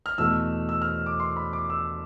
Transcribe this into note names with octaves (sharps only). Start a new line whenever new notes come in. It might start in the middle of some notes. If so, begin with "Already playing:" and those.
F6
E2 B2 A3 E6
E6
F6
D6
C6
B5
D6
E6